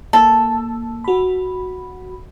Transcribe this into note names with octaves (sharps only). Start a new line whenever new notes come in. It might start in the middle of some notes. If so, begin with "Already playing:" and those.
A#3 A4
F#4 B5